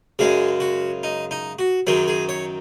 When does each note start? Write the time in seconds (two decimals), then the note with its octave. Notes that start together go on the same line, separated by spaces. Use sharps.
0.19 F#2 C#3 G#3 G#4
0.60 F#4
1.03 D#4
1.31 D#4
1.59 F#4
1.87 F#2 D#3 F#3 G#4
2.08 G#4
2.29 C#5